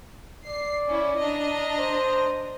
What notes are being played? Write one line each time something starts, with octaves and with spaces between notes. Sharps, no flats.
D5 C7
C#4 E4
D4 D#5 A#5
C5